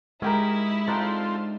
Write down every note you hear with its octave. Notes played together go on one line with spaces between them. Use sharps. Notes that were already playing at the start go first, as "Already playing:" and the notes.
G#3 C#4 D#4 E4 G4 A#4
C4 D4 D#4 F4 A4 G5